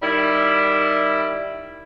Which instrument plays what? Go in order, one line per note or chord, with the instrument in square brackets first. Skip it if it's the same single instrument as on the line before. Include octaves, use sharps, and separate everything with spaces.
[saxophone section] D#3 G3 E4